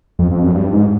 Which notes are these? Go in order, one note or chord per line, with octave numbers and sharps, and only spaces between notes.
F2
F2
F#2
G2
G#2